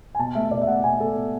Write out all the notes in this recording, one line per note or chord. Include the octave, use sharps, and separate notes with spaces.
G#5
B2 A5
A3 E5
B2 D5
E5
A3 F#5
B2 G#5
A3 A4
B2